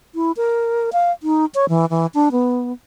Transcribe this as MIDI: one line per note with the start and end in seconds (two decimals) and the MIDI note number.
0.15 0.32 64
0.37 0.90 70
0.93 1.12 77
1.23 1.45 63
1.54 1.65 73
1.69 1.85 52
1.90 2.06 52
2.14 2.29 62
2.32 2.72 59